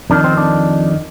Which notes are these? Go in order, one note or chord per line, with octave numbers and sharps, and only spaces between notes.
F2 D#3 D4
C4
D4